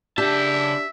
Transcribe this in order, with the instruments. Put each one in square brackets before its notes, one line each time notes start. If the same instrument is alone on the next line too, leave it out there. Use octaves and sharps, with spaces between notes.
[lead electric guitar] C#3 A5 [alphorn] D4 [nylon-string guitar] G4 [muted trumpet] E5